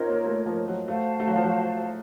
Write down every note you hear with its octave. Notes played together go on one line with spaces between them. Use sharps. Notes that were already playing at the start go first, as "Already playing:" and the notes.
Already playing: C4 C#4 D#4 F4 A#4 C#5
A#3
A3
F3
F#3
A3 F#4 C5 F5 A5
A3
F#3
F3
F#3